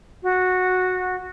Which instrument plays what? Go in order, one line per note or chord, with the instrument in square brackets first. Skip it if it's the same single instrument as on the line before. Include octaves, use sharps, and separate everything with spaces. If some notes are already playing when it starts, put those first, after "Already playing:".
[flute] F#4